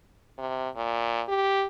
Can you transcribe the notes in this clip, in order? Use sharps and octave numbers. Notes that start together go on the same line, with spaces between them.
C3
A#2
G4